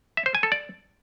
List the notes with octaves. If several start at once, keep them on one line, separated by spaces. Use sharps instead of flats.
E5
C5
G#5
A4
D5